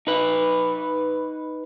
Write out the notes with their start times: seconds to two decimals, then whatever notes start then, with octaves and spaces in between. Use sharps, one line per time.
0.07 D#4 B4